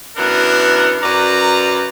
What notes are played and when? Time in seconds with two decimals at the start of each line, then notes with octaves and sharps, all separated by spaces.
0.17 F#2 E3 B3 D4 A#4
1.03 F#2 B4 D5 A#5